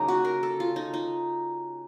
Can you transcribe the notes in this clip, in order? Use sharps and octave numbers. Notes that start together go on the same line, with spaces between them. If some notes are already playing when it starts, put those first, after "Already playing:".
Already playing: C#3 F#3 A#3 D#4
F#4
A#4
A4
F4
D#4
D#4